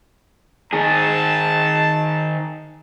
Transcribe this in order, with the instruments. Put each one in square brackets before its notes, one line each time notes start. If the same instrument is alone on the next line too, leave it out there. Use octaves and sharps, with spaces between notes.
[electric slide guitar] D#3 G#4 [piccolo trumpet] A5